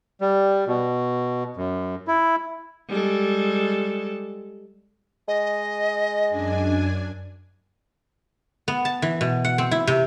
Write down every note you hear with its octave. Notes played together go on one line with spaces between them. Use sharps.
G3
B2
F#2
E4
G3 G#3 A4
G#3 D#5
F#2 D4 G#5
B3
A5
E3
B2
F#5
C4
E4
C3